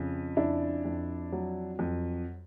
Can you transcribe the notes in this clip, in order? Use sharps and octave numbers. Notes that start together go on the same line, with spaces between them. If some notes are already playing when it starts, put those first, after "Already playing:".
Already playing: F2 C#3
F2 D4 E4
F2
F#3
F2